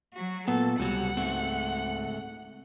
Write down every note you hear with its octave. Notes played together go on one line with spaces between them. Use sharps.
F#3 F#4
A#2 B3 A4
C#2 C3 F#3 G3 F#5
G#2 A3 C4